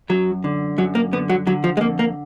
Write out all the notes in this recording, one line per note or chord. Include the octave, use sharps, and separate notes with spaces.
F#2 F#3
D3
F#2 F#3
A#3
D3 B3
F#3
D3 F#3
F3
G#3
F2 A#3
A#3